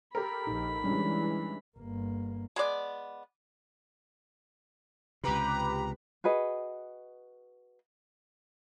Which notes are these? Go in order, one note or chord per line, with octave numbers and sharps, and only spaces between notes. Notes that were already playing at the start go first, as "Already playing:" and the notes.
G4 A4 A#4 B5
A#1 D#4
E3 G3 G#3 C#4 D4
G1 A#3
G#3 B3 D5
C#2 C3 G4 B4 A#5 B5
F#4 G#4 B4 D#5